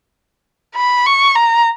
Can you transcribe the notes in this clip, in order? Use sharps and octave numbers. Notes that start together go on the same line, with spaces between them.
B5
C#6
A#5